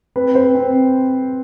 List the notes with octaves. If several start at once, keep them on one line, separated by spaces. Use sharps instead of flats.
C4 B4
C4 C5
C4